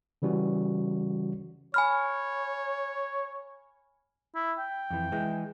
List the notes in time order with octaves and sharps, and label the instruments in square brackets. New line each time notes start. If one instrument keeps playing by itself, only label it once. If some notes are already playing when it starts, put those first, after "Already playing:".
[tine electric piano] C#3 E3 G3 C#4 F#4
[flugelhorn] C#5 [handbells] G#5 B5 F6
[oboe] E4
G5
[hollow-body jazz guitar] F2 E3
E3 G#3